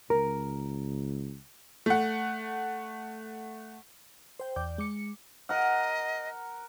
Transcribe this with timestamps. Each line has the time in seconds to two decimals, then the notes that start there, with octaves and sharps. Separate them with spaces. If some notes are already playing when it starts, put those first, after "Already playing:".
0.10 C#2 A#4
1.86 A3 F#5
4.40 C5 G5
4.56 E2 D5 G5 D6 G6
4.78 G#3 D6 C#7
5.49 A#4 D#5 F#5